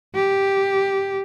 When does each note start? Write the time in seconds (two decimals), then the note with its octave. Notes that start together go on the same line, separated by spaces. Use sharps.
0.15 G4